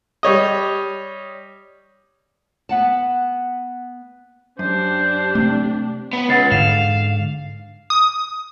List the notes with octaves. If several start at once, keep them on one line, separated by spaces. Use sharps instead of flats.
G3 C#5 D#5
B3 F#5 A5
F#2 D4 G4 C5
C3 A3 C4
B3
C#2 F#5 A6 C7
G#2 D3 F5 E7
D#6